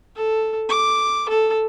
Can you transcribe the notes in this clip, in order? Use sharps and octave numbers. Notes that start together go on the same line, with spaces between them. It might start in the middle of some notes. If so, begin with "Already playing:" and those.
A4
D6
A4